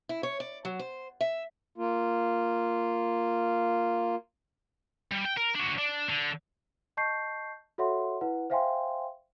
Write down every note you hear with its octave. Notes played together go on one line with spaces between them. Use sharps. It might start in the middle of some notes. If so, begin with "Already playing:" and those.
E4
C#5
D5
F#3
C5
E5
A#3 F4
G3
G5
A#4
D4 F#4
D4
D3
D#5 A5 C#6 G6 C7
F#4 A4 C#5 E5 F#5 C6
E4 B4 F#5
C5 E5 F5 G5 G#5 C6